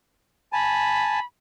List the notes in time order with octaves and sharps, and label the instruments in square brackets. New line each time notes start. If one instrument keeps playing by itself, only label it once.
[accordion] G#5 A5 [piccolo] B5